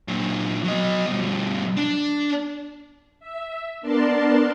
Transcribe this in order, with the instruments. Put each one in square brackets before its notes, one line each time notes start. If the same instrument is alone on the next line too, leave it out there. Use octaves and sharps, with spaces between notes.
[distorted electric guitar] A#2 F#3
F#3 D#5
G2 B2
D4
[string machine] E5
B3 D4 A#4 D5 A5 C6